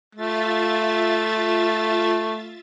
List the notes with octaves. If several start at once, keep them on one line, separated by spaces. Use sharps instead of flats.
A3 F4 E5 A6